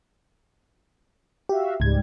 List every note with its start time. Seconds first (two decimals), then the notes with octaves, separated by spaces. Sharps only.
1.49 F#4 G4 E5 F5
1.80 C#2 G#2 G3 G#6